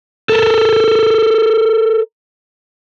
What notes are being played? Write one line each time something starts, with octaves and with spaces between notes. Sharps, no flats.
A4 A#4